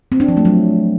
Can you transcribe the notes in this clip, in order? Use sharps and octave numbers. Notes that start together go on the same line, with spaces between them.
C4
D4
F3
A3
F#3